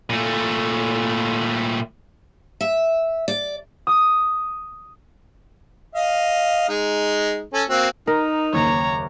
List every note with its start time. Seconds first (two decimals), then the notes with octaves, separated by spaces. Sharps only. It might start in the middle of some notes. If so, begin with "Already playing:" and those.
0.10 A#2 A3
2.61 E5
3.28 D5
3.87 D#6
5.95 D#5 F5
6.69 G#3 D#4
7.53 C#4 A4
7.69 A#3 C4 F#4
8.07 D#4 A#4
8.53 F#1 D#2 C#5 A#5